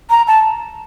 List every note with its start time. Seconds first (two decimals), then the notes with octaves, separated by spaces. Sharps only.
0.10 A#5
0.27 A5